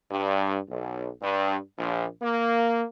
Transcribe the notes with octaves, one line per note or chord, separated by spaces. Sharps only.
G2
B1
G2
A#1
A#3